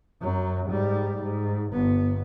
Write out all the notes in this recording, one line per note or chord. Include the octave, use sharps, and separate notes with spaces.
F#2 F#3
G#2 G3
G#2
G1 B3